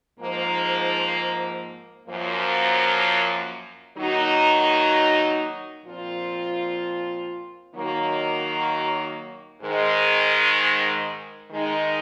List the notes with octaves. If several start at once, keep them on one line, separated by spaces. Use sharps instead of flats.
G#2 F3 A#3
F#2 F3 A#3
D#3 F#3 A#3 D#4 F#4
A#2 F3 C4 F4
D#3 F#3 A#3
G#2 D#3 G#3
D#3 G#3 D#4